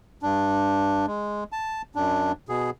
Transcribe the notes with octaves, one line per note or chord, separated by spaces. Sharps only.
G2 D4
G#3
A5
F#2 D4
B2 G#4